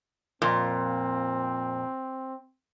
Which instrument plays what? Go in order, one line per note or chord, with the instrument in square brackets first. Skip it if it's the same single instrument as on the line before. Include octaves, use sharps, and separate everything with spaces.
[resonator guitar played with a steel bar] F2 A#2 [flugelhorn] C4